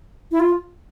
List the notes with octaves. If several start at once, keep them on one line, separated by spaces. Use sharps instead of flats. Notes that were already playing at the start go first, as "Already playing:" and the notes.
E4
F4